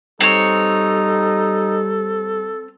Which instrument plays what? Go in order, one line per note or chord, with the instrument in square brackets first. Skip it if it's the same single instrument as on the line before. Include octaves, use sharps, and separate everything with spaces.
[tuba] G3 [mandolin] C4 C#5 [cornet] D#4 [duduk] A4